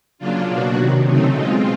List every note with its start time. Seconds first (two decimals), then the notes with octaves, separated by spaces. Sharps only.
0.18 C#3 F#3 A#3 D4 F4
0.48 B2 F#3 A#3 D4 F#4
0.77 C3 D#3 F#3
1.06 C#3 F#3 A3 C4 D#4
1.34 B2 G#3 C4 F4